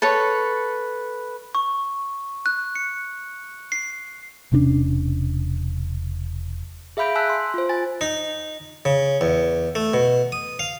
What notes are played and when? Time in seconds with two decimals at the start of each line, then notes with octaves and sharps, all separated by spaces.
0.02 A4 B4 C#5
1.55 C#6
2.46 F#6
2.75 C#7
3.72 C7
4.52 E1 C3 C#4 D4
6.97 G#4 E5 F5 B5 G6 D7
7.15 G#5 A5 E6 F#6 B6
7.29 C6
7.54 F4 C5
7.69 G#5 A6
8.01 D#4
8.85 C#3
9.21 E2
9.75 A3
9.93 B2
10.32 D#6
10.59 F5